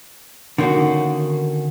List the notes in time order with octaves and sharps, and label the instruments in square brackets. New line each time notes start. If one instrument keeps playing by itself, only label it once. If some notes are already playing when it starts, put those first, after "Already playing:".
[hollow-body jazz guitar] D3 D#3 A#3 C#4 F#4